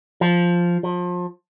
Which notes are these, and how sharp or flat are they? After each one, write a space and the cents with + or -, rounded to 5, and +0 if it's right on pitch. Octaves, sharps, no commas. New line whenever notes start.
F3 +0
F3 +30